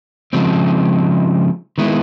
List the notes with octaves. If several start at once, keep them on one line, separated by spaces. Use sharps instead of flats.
C#3 F3 G#3 C4
D#3 G#3 B3 E4